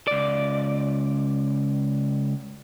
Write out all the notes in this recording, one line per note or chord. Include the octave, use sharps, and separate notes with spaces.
C#2 D5